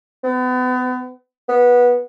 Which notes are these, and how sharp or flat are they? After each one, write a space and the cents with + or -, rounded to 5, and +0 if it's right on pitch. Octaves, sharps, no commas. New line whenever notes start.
B3 +35
B3 -15